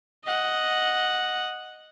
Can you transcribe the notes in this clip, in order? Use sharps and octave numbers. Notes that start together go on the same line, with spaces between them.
D#5 F#5